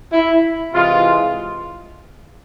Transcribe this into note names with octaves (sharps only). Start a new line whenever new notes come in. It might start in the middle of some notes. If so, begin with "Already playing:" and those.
E4
C3 E3 G#3 F4